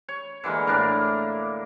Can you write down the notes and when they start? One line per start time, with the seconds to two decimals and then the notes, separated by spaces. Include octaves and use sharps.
0.09 C#5
0.44 D3 E3 G#3 A#3
0.67 A2 A#3 D4 A#4